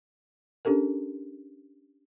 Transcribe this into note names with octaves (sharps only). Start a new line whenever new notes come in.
C#4 D4 G4 A4 A#4